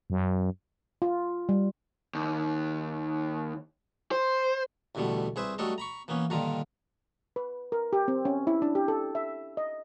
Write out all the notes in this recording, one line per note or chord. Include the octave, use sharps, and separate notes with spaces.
F#2
F4
G3
D#2
C5
A1 E2 B2 D3 G3 A3
C2 G#4 B4 C5 E5
F#3 G3 A3 D4 A4 D#5
A#5 B5 C#6
E3 A#3 B3 C#4
G2 A#2 D3 D#3 F4 A#5
B4
A#4
G4
C4
C#4
E4
D4
G4
A4
E5
D#5